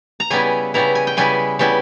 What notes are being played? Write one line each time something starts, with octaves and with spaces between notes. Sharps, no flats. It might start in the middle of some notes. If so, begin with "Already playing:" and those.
A#5
C#3 G3 B3 E4 G#5
C#3 G3 B3 E4 A#5
G#5
G5
C#3 G3 B3 E4 G#5
C#3 G3 B3 E4